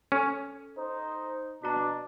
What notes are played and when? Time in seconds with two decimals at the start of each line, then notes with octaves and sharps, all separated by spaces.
0.12 C#4 A4
0.78 D#4 C5
1.63 B2 D4 F#4 A#5